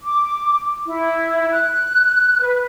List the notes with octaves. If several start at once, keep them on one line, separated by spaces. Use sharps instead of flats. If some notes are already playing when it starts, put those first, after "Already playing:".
D6
E4
F#6
B4